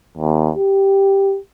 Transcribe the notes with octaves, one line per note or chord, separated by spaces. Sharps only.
D#2
G4